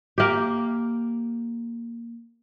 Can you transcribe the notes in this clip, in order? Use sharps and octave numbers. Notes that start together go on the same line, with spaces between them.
A#3 G4